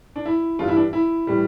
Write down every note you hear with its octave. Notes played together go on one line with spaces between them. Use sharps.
D4
E4
A1 G2 E3 G3 F4
E4
D4
E4
A2 E3 G3